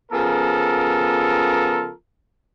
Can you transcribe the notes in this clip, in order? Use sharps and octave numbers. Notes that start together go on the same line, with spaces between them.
C#3 F3 B3 F4 A4 A#4